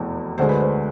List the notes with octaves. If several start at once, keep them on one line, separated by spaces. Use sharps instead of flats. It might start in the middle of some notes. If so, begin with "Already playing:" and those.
Already playing: F1 E2 B2
D2 D3 G#3 C5
B4
C5